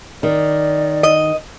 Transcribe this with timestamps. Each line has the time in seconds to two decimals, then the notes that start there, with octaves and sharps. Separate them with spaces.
0.23 D#3 D5
1.03 D#5